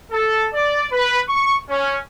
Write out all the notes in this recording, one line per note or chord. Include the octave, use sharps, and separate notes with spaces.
A4
D5
B4
C#6
C#4